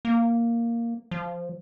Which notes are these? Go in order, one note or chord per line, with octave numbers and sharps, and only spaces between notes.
A#3
F3